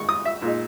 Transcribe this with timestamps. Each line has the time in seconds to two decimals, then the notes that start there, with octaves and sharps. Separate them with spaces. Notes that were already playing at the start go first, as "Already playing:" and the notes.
Already playing: G#2 D#3 G#3 C#6
0.09 D#6
0.25 E5
0.42 A#2 G#3 D#4